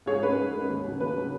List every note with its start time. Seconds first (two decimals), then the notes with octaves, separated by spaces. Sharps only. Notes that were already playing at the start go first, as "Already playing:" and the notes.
0.06 G#2 G#4 C#5
0.22 G#3 C#4 B4
0.38 G#2
0.53 G#3 C#4
0.68 D#2
0.84 C#3 F#3 C#4
1.00 D#2 B4
1.15 C#3 F#3 C#4